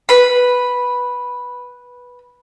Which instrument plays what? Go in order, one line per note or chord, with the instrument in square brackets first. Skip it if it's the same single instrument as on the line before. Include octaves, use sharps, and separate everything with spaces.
[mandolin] B4 B5